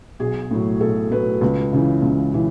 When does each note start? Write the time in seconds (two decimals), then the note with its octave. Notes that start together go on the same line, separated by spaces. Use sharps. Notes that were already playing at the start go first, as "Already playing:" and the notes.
0.19 B1 G#4
0.51 A2 F#3
0.80 B1 A4
1.11 A2 F#3 B4
1.41 C#2 B4
1.73 C#3 E3
2.02 C#2
2.34 C#3 E3